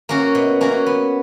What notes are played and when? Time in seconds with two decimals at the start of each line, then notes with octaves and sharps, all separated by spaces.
0.09 A#3 C#4 F#4
0.35 B2
0.61 A#3 C#4 F#4
0.86 B3